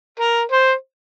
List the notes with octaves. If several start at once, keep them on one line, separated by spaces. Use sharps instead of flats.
A#4
C5